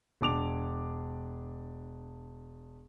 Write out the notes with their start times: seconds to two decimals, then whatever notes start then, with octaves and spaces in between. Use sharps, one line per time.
0.21 E1 D4 D6 F7